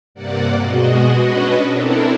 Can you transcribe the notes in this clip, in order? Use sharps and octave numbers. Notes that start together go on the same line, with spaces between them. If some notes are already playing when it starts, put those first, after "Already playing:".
G2 C3 A#3 D5 F#5
B2 G#3 F#4 D#5
C#4 D4 F#4 B4 D#5
C4 D4 E4 A4 A#4